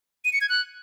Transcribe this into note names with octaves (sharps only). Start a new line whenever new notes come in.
D#7
C#7
G#6
F#6